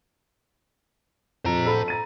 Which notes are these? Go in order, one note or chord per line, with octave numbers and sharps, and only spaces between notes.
F2 F3 C5 A#5
A4 B5
A#5 A6 D#7